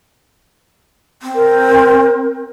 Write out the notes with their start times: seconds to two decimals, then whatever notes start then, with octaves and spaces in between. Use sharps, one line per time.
1.22 C4
1.35 A#4